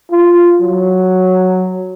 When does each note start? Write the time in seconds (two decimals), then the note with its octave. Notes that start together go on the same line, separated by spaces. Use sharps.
0.11 F4
0.62 F#3